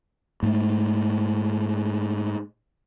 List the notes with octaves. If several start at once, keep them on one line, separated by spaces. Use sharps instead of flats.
G#2 A3